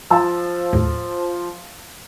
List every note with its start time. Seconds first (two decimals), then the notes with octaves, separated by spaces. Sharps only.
0.10 F3 F5 A5 E6
0.73 D#2 A2